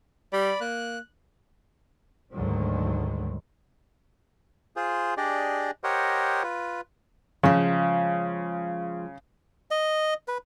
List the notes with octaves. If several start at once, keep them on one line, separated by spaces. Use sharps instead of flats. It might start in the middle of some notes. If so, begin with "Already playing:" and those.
G3 D5 B5
A#3 F#6
D2 G#2 D3 D#3 F#3 G3
F4 G#4 C5
D4 G4 G#4 D5 D#5
G4 A#4 C5 C#5 D#5 F#5
F4 B4
C#3 F3 G#3
D#5
B4